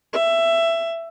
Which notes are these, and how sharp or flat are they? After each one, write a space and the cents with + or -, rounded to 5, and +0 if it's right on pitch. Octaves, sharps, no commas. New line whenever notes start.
E5 +15